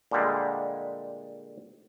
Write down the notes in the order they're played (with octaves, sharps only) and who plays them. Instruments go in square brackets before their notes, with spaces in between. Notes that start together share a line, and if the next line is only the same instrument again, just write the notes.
[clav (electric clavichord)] A#2 D3 G3 G#3